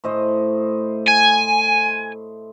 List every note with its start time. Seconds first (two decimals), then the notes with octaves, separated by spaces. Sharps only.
0.04 A2 C5 D#5
1.08 G#5